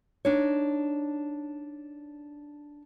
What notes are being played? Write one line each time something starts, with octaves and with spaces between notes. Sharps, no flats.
D4 D#4 C#5